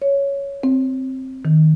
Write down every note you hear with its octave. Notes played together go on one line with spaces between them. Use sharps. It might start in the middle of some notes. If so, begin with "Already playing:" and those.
C#5
C4
D#3